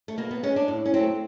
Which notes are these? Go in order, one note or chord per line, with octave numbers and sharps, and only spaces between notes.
A3
B2 A#3
B3
G#3 C#4
D4
A2
C#4
F#3 A3 C4